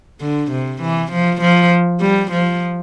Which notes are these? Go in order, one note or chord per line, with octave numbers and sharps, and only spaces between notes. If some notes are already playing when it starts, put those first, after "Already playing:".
D3
C3
E3
F3
F3
G3
F3